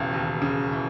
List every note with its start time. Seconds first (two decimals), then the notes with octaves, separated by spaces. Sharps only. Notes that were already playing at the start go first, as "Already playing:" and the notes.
Already playing: E1 D#2 C#3 E3
0.13 D#2
0.42 C#3
0.72 E3